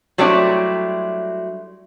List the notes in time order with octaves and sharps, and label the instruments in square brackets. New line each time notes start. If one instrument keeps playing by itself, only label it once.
[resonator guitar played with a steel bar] F#3 G3 A3 C4 D4 E4